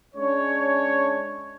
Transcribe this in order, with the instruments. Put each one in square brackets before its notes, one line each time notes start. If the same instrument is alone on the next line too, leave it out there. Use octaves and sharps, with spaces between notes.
[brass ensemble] G#3 C#4 D4 C#5